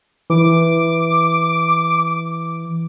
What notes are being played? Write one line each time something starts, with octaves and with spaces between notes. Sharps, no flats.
E3 D6